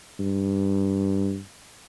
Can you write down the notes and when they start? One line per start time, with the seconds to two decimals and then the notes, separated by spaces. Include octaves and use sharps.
0.19 G2